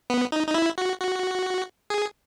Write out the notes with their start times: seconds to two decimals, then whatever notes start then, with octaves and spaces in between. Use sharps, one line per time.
0.10 B3
0.32 D#4
0.47 D#4
0.54 E4
0.78 F#4
1.00 F#4
1.90 G#4